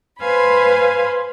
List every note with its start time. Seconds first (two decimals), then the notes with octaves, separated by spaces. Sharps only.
0.20 B4 C5 F5 G#5 B5